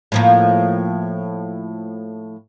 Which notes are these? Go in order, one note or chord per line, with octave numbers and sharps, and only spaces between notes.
A2 F3 A#3